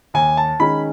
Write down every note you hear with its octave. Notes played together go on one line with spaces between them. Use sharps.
D#2 G#5
A5
D#3 G#3 C#4 B5